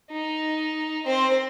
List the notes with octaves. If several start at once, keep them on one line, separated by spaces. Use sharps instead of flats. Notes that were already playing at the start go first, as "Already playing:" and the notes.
D#4
C4 C5